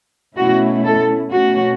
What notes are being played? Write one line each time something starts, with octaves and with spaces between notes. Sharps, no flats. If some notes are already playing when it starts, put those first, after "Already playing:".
B2 A3 C#4 E4 F#4
A4
B2 A3 C#4 F#4